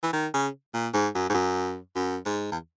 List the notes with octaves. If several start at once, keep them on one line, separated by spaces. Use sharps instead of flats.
E3
D#3
C#3
A#2
G#2
F#2
G#2
F#2
F#2
G#2
E2